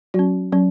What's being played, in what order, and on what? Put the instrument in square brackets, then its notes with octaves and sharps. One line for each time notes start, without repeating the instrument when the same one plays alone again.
[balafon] F#3 C#4 F#4
F#3 C#4